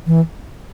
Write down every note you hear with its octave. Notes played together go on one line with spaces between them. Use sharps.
E3